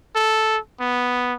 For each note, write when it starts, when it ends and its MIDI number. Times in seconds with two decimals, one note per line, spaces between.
0.16 0.57 69
0.80 1.33 59